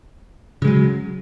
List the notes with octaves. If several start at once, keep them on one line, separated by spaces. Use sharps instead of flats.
C#3 F#3 G#3